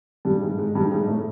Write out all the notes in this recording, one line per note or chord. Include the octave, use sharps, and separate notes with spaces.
G2 G3
G#2 G#3
G#2 G#3
G2 G3
G#2 G#3
A2 A3